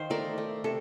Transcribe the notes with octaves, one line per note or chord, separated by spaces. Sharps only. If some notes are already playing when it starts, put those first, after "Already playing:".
Already playing: D#3 C5 F5
A3 A#4 D5
A3
C3 A4